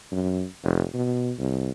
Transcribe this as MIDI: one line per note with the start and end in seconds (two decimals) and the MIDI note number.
0.12 0.45 42
0.64 0.83 29
0.94 1.33 47
1.39 1.71 36